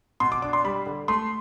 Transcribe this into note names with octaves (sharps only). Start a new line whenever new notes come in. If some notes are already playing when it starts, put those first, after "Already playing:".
B2 C6
D6
D4 D6
C6
G3 B5
D3
A3 C6